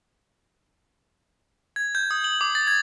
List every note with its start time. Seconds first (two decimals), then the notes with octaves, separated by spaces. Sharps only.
1.76 G#6
1.95 G6
2.11 D#6
2.24 F#7
2.41 D6
2.55 A6
2.67 G#6